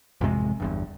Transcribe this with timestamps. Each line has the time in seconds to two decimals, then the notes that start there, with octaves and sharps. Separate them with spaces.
0.21 A1 F2 C3 G#3
0.60 G1 E2 G2